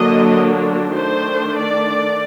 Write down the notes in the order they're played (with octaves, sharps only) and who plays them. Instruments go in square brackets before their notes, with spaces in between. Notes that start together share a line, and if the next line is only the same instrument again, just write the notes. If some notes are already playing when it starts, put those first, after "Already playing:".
Already playing: [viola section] D3 F#3 A#3 D4 D#5
D#3 A3 D4 C5
D5